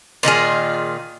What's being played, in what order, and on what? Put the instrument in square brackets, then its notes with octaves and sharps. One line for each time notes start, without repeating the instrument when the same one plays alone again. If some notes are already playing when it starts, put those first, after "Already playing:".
[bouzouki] A#2 D#3 F4 G#4